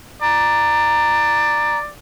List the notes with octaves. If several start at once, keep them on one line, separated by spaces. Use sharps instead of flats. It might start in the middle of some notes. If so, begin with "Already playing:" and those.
D5 A#5